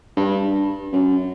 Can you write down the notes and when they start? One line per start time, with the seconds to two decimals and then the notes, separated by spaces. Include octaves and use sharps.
0.17 G2
0.93 F#2